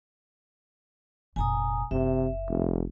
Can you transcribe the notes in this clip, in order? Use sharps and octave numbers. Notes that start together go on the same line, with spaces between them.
F1 A#2 G#5 A#5 D#6
F#1 C3 E5
F1